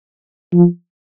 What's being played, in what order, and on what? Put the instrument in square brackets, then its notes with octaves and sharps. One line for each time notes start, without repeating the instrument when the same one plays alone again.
[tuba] F3